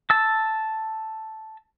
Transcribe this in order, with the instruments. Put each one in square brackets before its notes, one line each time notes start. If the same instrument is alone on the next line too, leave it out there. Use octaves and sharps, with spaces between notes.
[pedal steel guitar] A5 E6